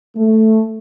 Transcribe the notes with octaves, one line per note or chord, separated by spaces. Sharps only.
A3